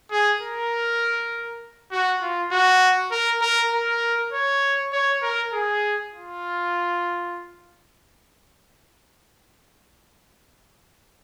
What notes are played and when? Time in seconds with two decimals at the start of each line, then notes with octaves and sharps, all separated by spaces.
0.11 G#4
0.41 A#4
1.91 F#4
2.21 F4
2.51 F#4
3.11 A#4
3.41 A#4
3.72 A#4
4.32 C#5
4.92 C#5
5.22 A#4
5.52 G#4
6.12 F4